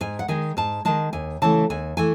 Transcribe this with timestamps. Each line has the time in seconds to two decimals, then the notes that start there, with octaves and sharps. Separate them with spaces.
0.01 G#2 G#5
0.19 F#5
0.28 D#3 G#3 G#5
0.57 G#2 A5
0.85 D#3 G#3 A5
1.13 D#2 G#5
1.42 C#3 E3 A3 A5
1.70 D#2 G#5
1.97 E3 A3 G#5